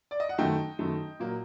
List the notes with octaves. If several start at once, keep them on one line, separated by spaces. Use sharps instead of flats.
D5
D#5
F#5
F#2 D#3 A3 D#5 G5
F#2 D#3 A3
A#2 F#3 A#3